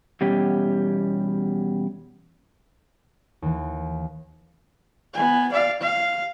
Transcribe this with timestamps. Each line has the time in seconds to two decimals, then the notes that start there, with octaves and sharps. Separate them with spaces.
0.21 E2 B2 G3 C#4 G4
3.42 D#2 E3
5.14 B3 G#5
5.52 D5 F5
5.82 F5